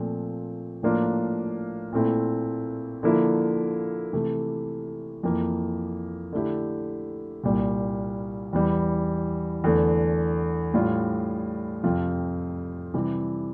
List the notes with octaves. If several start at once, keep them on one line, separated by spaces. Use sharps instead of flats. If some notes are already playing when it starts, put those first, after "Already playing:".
Already playing: A#2 F3 A3 C4
A2 F3 A#3 D4 F4
A#2 A3 C4 E4
D3 F3 A#3 E4
C3 E3 A3
F2 E3 A#3
D3 A3 E4 G4
C2 A#2 G3
E2 E3 G3
E2 D3 A3
A2 G3 D4 F4
F2 C3 F3 C4 F4
C3 E3 G3